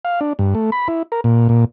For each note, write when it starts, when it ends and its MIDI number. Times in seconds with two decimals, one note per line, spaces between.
0.05 0.20 77
0.21 0.33 62
0.39 0.54 43
0.55 0.70 57
0.72 0.88 83
0.88 1.03 64
1.12 1.21 70
1.24 1.48 46
1.49 1.65 46